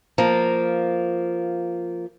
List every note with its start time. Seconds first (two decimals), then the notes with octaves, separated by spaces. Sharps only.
0.18 F3 A#3